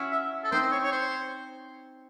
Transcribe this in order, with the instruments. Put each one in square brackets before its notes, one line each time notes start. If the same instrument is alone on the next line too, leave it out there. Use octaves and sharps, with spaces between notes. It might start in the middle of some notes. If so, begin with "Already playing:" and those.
Already playing: [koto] C#4 E4 F#4
[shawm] E5
A4
[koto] C4 D#4 [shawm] C5
[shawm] C#5
C#5
C5